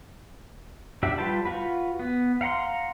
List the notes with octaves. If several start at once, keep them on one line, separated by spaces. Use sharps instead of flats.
D4 F#4 G4 E5
G3 F4 B4 G5 A5
F4 F#4 B4
B3
F5 F#5 A#5 C6